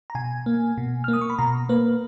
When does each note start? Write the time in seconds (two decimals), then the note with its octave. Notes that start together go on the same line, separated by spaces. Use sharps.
0.10 A#5
0.15 B2 G#5
0.46 A#3
0.78 B2
1.04 F6
1.08 A#3
1.13 D#6
1.21 C#6
1.30 B5
1.39 B2 A#5
1.69 A#3 B4